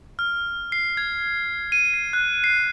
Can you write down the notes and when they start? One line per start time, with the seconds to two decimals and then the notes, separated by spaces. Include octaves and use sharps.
0.19 F6
0.72 C7
0.97 G#6
1.72 D#7
1.94 C7
2.13 F#6
2.44 C7